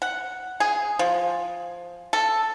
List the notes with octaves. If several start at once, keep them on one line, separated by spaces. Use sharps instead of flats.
F#5
G#4
F3
A4